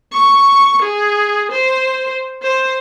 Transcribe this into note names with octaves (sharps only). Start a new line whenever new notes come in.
C#6
G#4
C5
C5